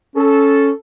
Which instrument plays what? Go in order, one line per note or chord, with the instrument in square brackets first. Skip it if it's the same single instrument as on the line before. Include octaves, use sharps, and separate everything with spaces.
[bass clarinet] C#4 [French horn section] A4